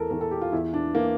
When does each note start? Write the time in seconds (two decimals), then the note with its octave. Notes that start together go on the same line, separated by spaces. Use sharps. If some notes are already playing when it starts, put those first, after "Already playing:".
Already playing: E2 E3 A4 A#4
0.10 E2 E3 A#4
0.21 A4
0.31 G4
0.42 F4
0.52 E2 E3 E4
0.74 D4
0.95 E3 A#3